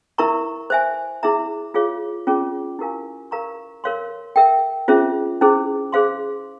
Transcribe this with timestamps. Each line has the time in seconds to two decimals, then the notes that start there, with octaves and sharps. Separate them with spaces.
0.18 E4 A#4 E5 A#5 C#6
0.70 C5 E5 G#5
1.23 E4 G#4 E5 A#5
1.74 F4 G#4 C#5 F5
2.27 C#4 F4 G#4 C#5
2.79 E4 G4 A#4 F5 G#5
3.31 A#4 F5 A#5 C#6
3.84 A#4 C#5 F5 C6
4.36 A#4 E5 G5
4.88 C#4 F4 G#4 C5 E5
5.41 C#4 E4 G#4 C5
5.93 G#4 C5 F5 C6